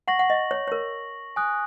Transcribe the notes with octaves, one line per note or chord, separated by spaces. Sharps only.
F#5 C#6 A#6 F#7
F#5
D#5
C#5
C#5
A#4
G#5 D#6 F#6